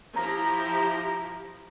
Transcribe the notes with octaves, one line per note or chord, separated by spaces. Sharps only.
F3 E4 G4 A#5